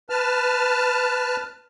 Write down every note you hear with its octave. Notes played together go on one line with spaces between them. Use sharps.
B4 A5 F6